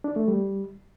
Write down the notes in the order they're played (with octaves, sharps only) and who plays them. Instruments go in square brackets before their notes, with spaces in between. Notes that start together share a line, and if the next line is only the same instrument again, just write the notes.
[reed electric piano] D4
A3
G3